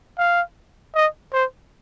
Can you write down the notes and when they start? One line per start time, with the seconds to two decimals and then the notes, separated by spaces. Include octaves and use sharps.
0.18 F5
0.95 D#5
1.33 C5